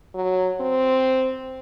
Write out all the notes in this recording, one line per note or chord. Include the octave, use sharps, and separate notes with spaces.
F#3
C4